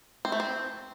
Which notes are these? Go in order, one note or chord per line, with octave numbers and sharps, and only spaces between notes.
C4
A3
C4